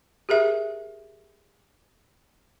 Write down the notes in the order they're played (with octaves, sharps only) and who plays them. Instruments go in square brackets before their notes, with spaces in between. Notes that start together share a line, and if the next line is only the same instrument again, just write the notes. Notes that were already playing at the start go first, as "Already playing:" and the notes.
[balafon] G4 G#4 A#4 E5